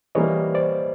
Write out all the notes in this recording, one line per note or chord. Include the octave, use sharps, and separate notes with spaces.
E3 G3 A#3 C#5 D#5
C5 D5